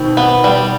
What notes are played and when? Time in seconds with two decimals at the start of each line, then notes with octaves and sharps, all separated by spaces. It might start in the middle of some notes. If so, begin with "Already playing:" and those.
Already playing: B2 D#3 C4
0.17 B3
0.44 G3